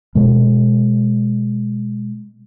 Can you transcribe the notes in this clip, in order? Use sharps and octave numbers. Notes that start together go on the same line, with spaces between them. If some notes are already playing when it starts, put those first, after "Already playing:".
B2 G#3